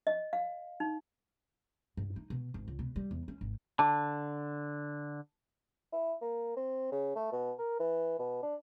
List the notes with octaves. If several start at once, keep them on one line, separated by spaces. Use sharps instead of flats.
D#5
F5
D#4
G2
D#4
B2
G#1
C#2
B2
G3
E2
C#4
G#1
D3 A5
E4
A#3
C4
C#3
A3
B2
A#4
E3
B2
D4